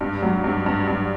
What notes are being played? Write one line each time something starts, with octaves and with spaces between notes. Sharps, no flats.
G2
F#3
G2
G2
G2